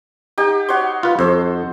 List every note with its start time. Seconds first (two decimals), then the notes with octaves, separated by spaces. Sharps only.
0.38 D#4 G4
0.69 F#4 C#5 C6
1.03 F4 B4
1.19 F2 A4 C5